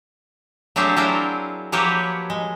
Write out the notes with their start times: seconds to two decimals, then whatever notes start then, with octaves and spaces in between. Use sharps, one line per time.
0.76 F#3 A3 C4 D4 G4 G#4
0.96 F#3 C4 D4 E4 F4 A#4
1.72 F3 F#3 A#3 G4 B4 C#5
2.30 G#3